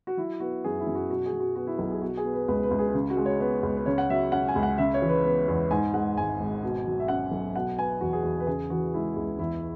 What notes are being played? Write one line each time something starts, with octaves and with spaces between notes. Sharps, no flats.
F#4
F#3 E4
B3 F#4
F#2 G#4
E4
F#2
F#4
B2 F#4
G#4
F#3
F#4
B3 F#4
E4
B1 F#4
G#4
B2 F#4
G#4
B3
B4
C#2 B4
B4
C#2
G#4
C#3
F#4
G#3
C#5
B3 C#5
C#2
B4
C#3 C#5
F#5
F#3 E5
C#4 F#5
G#5
C#2
F#5
C#3 E5
C#5
E3
B4
B3
E2
G#2 G#5
G#3 F#5
G#1 G#5
G#1
B2
F#3
E5
C#4 F#5
B1
B2 F#5
B3 G#5
E2 F#4
G#4
E2 F#4
B4
C#3 G#4
E3 F#4
G#3 E4
C#2
E2 E4